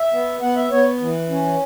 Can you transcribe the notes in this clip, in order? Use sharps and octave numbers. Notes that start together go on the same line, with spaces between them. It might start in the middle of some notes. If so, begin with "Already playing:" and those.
Already playing: E5
B3
B3 F#5
E5
B3 C#5
E3
C#4